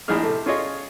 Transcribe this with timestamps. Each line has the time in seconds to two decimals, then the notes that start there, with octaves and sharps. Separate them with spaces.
0.08 A#1 A2 D#4 G#4 F6
0.23 C3 A3
0.46 C#4 F4 G#4 C#5 D#5